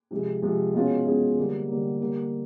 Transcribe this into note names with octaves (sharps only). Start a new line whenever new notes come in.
C3 F3 G#3
C3 F3 G#3
B2 G#3 C#4 F4 G#4
B2 G#3 C#4 F4 G#4
D3 G3 A#3
D3 G3 A#3
D3 G3 A#3